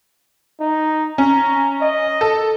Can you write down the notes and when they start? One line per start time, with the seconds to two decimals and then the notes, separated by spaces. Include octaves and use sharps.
0.61 D#4
1.18 C#4 A#5
1.82 D#5
2.21 A4